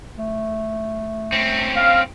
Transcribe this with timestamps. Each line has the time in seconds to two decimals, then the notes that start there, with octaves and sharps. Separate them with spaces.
0.19 A3
1.32 C4 C#4
1.77 F5